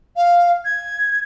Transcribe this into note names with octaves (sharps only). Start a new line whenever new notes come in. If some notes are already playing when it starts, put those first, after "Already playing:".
F5
G#6